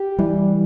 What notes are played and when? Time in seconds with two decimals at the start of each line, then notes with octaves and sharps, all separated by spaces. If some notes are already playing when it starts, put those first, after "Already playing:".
Already playing: G4
0.19 E3 G3